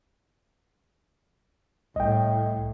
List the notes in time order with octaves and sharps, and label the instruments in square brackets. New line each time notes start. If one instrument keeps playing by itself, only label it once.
[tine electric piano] C2 [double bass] A2 [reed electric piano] D#5 G5